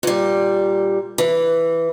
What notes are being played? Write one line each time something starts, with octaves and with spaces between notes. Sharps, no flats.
A#2 G3
E3